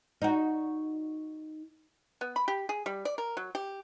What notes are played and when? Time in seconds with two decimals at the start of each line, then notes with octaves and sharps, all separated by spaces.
0.22 D#4 F#4
2.21 B3
2.36 B5
2.48 G4
2.69 G#4
2.86 G3
3.05 D5
3.18 A#4
3.37 F#3
3.55 G4